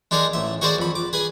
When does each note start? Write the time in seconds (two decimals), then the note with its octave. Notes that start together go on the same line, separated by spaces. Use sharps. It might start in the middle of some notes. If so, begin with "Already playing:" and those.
0.11 G#3 D4 D#4 G#4 A#4
0.33 A1 E5
0.62 F#4 G#4 A#4 C5 D5 A5
0.78 F2 B5
0.95 D6
1.13 G#4 B4 G#5